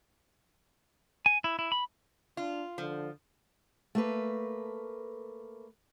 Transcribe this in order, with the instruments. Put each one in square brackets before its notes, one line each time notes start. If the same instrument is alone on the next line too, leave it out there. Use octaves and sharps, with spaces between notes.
[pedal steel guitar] G#5
E4
E4
B5
[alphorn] D4 [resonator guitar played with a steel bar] F4
[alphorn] D3 [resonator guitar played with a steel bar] F3
[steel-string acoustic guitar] A3 A#3 B4